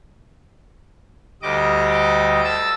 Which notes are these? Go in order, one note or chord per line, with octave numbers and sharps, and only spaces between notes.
D2 G3 D#5 D6
A5 E6